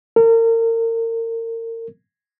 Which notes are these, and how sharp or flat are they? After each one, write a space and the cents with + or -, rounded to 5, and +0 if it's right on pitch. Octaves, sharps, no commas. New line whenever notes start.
A#4 -35